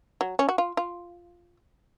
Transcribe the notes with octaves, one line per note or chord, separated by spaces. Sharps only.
F#3
C#4
F#4
F4
F4